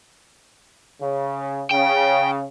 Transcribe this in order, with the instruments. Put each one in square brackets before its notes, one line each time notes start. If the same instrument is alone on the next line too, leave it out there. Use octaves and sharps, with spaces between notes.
[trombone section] C#3
[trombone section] C#3 [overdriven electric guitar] G5